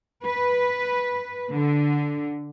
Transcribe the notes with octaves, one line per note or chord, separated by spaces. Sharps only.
B4
D3